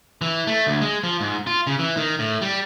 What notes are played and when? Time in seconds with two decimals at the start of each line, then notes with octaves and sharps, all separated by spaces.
0.22 E3
0.47 A3
0.67 D2
0.81 G#3
1.04 F3
1.21 G#2
1.47 F4
1.67 C#3
1.79 E3
1.97 D#3
2.19 A2
2.42 G3